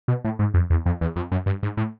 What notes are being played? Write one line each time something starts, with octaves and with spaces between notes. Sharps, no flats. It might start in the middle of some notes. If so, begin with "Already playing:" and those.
B2
A2
G#2
F2
E2
F2
E2
F2
F#2
G2
G#2
A2